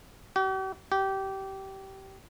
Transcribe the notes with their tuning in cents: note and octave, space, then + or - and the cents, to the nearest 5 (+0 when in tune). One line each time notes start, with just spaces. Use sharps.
G4 -45
G4 -20